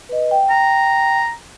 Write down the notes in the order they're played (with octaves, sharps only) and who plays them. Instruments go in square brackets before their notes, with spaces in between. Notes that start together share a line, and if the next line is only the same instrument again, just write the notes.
[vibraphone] B4 D#5
G5
[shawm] A#5